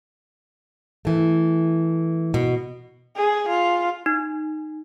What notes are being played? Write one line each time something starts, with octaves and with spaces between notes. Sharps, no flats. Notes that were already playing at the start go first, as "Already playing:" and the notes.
E3 A3
B2
G#4
F4
D#4